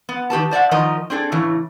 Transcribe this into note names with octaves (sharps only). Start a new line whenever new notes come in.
B3
D#3 G4 B4 A5
C5 D5 E5 F#5
D#3 F3 D#4 A#4 D#5
C4 D4 G#4 A4
A2 C#3 E3